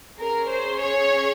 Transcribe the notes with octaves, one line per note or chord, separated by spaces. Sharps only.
C#4 G#4 A#4
C5
C#5